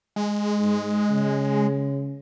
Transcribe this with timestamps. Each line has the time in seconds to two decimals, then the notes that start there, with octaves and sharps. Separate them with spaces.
0.16 G#3
0.59 G#2
1.09 C#3